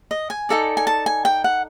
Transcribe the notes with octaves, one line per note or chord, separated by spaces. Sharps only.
D#5
G#5
D#4 F#4 A4 D5
G#5
A5
G#5
G5
F#5